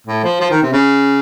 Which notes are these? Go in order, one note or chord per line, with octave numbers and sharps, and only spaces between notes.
A2
F3
F3
D#3
C3
C#3